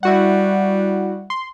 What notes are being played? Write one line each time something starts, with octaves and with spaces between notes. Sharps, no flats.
G3 E4 F#4 F#5
C6